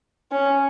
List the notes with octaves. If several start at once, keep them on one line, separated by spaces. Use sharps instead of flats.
C#4